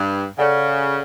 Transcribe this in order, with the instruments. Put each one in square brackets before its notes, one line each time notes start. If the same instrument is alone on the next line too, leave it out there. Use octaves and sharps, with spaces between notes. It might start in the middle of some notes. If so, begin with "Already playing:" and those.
Already playing: [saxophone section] G2
[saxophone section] C#3 [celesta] A4 D5 F#5